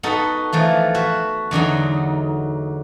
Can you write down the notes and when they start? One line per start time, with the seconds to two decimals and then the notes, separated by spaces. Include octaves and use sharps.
0.03 B3 D#4 F#4 A4
0.53 E3 F3 A3
0.94 F#4 B4 E5
1.51 E2 D3 F#3 D#4